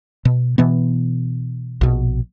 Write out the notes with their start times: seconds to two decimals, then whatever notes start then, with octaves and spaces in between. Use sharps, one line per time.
0.25 B2
0.58 B2 E3 B3
1.81 A#1 B2